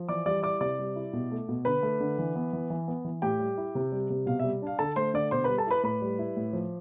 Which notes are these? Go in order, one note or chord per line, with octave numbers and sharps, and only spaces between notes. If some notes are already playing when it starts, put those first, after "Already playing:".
Already playing: F3
E3 D5 D6
G3 D5 D6
E4 D5 D6
C3 D5 D6
G3
E4
B2
A3
B2
D3 B4 B5
A3
D3
E3
B3
E3
E3
B3
E3
A2 G4 G5
G3
E4
C3
G3
C3
B2 F5
E5
G3
D4 F5
D3 A4 A5
A3 C5 C6
D3 D5 D6
B2 C5 C6
G3 B4 B5
A4 A5
E4 B4 B5
A2 B4 B5
G3
E4
A2
F3